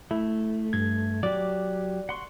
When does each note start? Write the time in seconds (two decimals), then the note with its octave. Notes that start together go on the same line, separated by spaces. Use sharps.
0.11 A3 E4
0.73 G2 G#6
1.23 F#3 G4 D5
2.09 F#5 C6 C#6